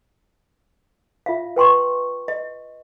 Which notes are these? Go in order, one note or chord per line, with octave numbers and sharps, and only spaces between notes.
F4 E5 F5
B4 G5 C6 C#6
D#5